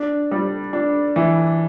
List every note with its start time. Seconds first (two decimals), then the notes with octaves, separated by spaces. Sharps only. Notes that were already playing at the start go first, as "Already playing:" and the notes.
Already playing: D4
0.31 G3
0.73 D4
1.16 E3